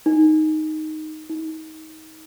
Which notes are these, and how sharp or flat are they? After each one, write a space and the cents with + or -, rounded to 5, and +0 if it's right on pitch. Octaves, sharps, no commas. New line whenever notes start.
D#4 +0
D#4 +25